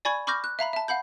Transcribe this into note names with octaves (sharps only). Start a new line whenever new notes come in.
D5 G#5 B5 C#6 G#6
B5 C#6 D6 F6 G6 A#6
F#6
E5 F5 A#5 B5
E5 A5
F5 F#5 B5 G6